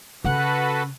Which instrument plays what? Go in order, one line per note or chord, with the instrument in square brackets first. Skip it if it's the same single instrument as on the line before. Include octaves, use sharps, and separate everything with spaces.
[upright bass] C#3 [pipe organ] F#4 A4 B4 [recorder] F#5